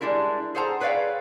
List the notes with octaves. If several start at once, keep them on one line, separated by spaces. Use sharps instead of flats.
G3 G#3 D4 E4 A#4
G#4 A4 C5 F#5 A5 A#5
G#4 B4 C#5 D5 F5 G5